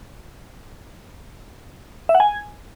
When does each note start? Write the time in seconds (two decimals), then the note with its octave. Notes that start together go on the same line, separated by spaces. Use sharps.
2.09 E5
2.15 F#5
2.20 G#5